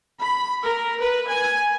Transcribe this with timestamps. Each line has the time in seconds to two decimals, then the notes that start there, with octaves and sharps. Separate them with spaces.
0.22 B5
0.64 A#4
1.02 B4
1.31 G#5